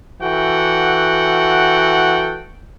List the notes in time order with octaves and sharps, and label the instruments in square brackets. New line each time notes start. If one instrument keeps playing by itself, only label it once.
[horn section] E3 F#4 A4 F#5 G5